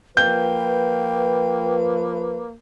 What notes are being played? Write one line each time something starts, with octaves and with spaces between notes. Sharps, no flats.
F3 A#3 B4 G5 G6